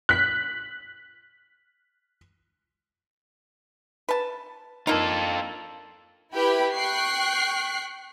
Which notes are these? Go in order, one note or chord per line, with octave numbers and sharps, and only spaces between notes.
F#6 B6
B4 A5
A#3 D4 D#4 F4 A4
E4 G4 B4 G5 B5
G5 C#6 F#6 C7